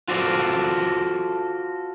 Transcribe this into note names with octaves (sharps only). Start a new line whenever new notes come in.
F4 F#4 A4 C5 D5